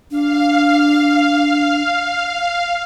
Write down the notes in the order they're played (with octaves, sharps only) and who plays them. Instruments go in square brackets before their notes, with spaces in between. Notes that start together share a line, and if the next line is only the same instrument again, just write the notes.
[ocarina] D4 [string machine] F5